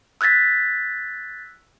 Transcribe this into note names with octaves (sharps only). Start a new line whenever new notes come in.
E6 F#6 G#6 A6 B6